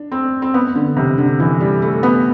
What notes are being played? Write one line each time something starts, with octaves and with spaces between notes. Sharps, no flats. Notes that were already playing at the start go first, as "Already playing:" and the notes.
Already playing: D4
C4
C4
B3
D3
C3
D3
E3
G3
A3
B3